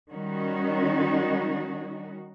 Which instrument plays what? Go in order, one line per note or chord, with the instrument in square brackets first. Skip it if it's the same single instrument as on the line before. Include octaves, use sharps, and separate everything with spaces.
[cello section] D#3 G3 C#4 D#4 F#4